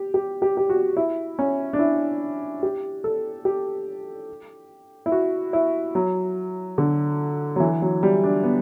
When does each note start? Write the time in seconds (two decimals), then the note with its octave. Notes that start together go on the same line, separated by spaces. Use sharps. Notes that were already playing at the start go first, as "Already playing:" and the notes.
Already playing: G4
0.14 G4
0.42 G4
0.57 G4
0.69 F#4
0.97 E4
1.39 C#4
1.73 D4
1.79 E4
2.63 G4
3.04 A4
3.45 G4
5.06 E4
5.12 F#4
5.53 E4
5.95 F#3
6.78 D3
7.56 F#3
7.60 E3
7.82 F#3
8.03 G3
8.24 D4
8.43 B3